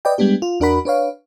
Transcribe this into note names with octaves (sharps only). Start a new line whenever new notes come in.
B4 D5 D#5 G5
G3 G#3 B3 D4 G4
F4
E2 D4 F#4 A#4 F#5 B5
D4 B4 C#5 F5